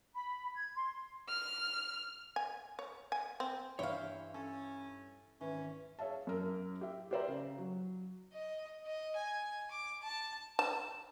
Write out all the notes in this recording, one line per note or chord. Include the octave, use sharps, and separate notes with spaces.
B5
G#6
C6
F6
G#5
C#5
G#5
C4
G2 E3 E4 C5 C#5 F5 G5
C#4 A4
G#1 E3 C#4
G#4 C#5 E5 F5 A5
F#2 A#4
G4 E5
G4 A#4 C5 D5 E5 A#5
C#3
F#3
D#5
D#5
G#5
D6
A5
A5